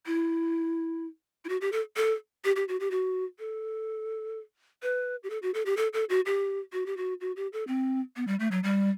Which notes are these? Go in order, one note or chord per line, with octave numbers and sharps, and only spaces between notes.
E4
E4
F#4
G4
A4
A4
G4
G4
F#4
G4
F#4
A4
B4
G4
A4
F#4
A4
G4
A4
A4
F#4
G4
F#4
G4
F#4
F#4
G4
A4
C4
B3
G3
A3
F#3
G3